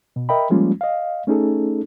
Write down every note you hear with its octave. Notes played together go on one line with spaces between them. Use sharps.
B2
A#4 D#5 E5 G5 B5
F3 G3 G#3 A#3 C#4 F4
D#5 F5
A3 C#4 D#4 G#4 A4